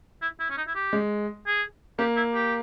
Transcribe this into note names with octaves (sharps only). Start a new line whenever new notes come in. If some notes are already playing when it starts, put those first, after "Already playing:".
E4
E4
C#4
D#4
E4
G4
G#3
G#4
A#3 G4
E4
G4